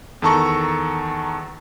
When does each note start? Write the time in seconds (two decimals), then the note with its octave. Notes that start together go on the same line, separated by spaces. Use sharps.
0.22 E2 D#3 A4 A5 A#5 C#6